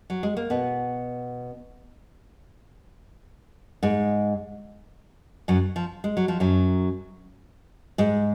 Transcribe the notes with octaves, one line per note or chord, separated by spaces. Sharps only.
F#3
G#3
A#3
B2 B3
G#2 G#3
F#2 F#3
F3
G#3
F#3
F3
F#2 F#3
G#2 G#3